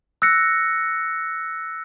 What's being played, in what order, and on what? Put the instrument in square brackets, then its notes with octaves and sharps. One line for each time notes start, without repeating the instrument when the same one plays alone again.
[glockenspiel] E6 F#6 A#6 C#7